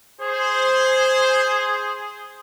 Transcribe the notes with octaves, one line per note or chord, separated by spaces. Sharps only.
G#4 C5